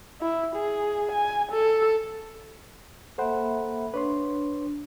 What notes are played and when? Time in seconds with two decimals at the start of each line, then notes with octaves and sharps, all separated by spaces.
0.21 E4
0.56 G#4
1.12 G#5
1.52 A4
3.18 A#3 A4 C5 E5 F#5 B5
3.94 D4 B4 C#5 C6